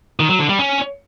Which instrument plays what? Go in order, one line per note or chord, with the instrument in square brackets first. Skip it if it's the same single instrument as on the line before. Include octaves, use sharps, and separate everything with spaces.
[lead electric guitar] D#3
F#3
D3
G3
C#4